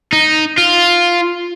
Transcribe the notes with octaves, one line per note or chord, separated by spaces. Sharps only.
D#4
F4